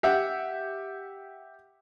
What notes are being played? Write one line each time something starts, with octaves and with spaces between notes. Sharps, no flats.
G4 E5 F#5